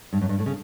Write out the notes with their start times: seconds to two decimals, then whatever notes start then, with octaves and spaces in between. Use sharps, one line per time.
0.13 G2
0.21 F#2
0.29 G2
0.39 A2
0.46 C#3